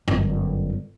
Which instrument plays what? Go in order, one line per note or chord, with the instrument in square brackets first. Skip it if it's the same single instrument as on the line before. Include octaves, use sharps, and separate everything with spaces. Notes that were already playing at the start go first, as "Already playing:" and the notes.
[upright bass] G1 F#2